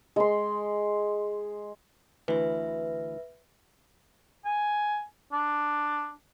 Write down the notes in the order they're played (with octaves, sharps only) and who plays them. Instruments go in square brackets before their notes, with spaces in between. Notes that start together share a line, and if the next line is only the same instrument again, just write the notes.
[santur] G#3 C6
[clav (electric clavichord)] D2 E3 [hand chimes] B4 E5
[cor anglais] G#5
D4